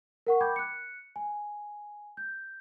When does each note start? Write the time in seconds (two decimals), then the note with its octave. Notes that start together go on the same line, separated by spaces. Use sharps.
0.27 A#4 F#5 C#6
0.40 G5 B5 D6 G6 G#6
0.56 F#6 C#7
1.16 G#5
2.17 G6